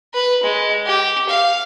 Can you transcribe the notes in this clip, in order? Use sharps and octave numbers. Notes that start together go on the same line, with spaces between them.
B4
G#3
G4
F5